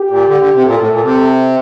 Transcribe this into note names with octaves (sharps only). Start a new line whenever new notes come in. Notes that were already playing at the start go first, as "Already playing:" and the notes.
Already playing: G4
A#2
D3
D3
C3
A#2 A4
A2
A#2
C3